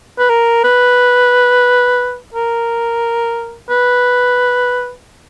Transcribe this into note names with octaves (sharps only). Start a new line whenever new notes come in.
B4
A#4
B4
A#4
B4